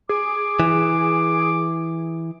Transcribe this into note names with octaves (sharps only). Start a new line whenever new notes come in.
G#4 D6
E3